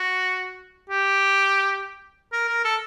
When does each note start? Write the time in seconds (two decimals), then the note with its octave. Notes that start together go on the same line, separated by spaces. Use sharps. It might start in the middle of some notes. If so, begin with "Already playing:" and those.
Already playing: F#4
0.89 G4
2.33 A#4
2.48 A#4
2.64 A4